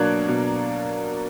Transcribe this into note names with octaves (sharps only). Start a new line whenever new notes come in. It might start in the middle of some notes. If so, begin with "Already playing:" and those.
Already playing: B2 F#3 A#3 D4 F#6 G#6
B2